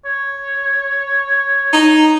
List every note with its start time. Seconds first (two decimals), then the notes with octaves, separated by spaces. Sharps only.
0.05 C#5
1.73 D#4